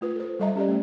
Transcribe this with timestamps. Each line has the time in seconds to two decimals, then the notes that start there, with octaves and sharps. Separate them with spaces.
0.01 A3 F4 B4
0.15 A4 C5
0.39 G3 A4 D#5 E5 A#5
0.55 C#4 G4 C5 D5
0.68 A3